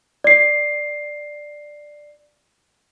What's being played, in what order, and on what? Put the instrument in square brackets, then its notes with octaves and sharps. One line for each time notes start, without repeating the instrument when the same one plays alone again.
[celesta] D5 C7